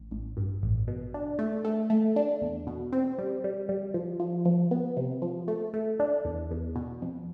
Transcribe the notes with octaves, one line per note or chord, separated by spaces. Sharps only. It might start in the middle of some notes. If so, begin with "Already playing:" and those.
Already playing: A1
A1
G2
A1
B2
D4
A3
A3
A3
D4
E2
B2
C4
G3
G3
G3
F3
F3
F3
B3
C3
F3
A3
A3
D4
E2
E2
B2
F2